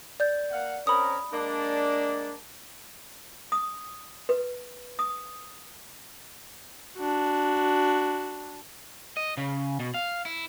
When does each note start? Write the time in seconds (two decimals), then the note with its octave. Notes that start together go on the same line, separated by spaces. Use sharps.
0.20 D5 G6
0.51 A#3 F5 F#5
0.87 C4 C#4 A#4 B5 D#6
1.34 G#3 A#3 D4
3.52 D#6
4.29 B4
4.99 D#6
6.96 D4 F#4
9.17 D#5
9.37 C#3
9.80 B2
9.94 F5
10.25 E4